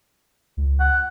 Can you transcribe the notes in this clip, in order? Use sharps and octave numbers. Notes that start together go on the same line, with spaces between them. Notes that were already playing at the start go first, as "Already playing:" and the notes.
C#2
F#5